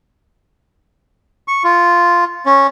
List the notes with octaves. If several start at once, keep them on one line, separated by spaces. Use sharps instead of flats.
C#6
F4
C#4